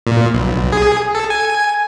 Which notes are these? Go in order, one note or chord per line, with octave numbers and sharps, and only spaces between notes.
A#2
B1
G#4
A4
G#5